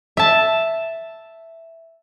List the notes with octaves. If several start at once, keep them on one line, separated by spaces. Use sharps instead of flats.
E5 A5